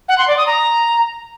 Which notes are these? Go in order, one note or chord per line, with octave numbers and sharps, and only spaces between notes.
F#5
C6
D5
D#6
A#5